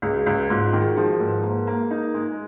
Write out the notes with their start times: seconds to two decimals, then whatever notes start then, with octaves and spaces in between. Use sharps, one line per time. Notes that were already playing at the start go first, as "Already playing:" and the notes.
0.02 C#2 G#4
0.14 F#4
0.26 C#2
0.38 F#4
0.50 G#2 F4
0.65 F#4
0.73 D#3
0.81 G#4
0.96 F3 G#4
1.12 A#4
1.20 G#2
1.28 B4
1.43 A#3
1.67 A#3
1.91 D#4
2.14 G#3